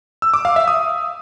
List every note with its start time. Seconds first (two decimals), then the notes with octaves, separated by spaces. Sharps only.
0.22 E6
0.34 D6
0.45 F5
0.56 E5
0.68 D#6